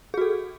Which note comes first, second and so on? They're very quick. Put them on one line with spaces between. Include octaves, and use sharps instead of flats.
G#4 F#4 A4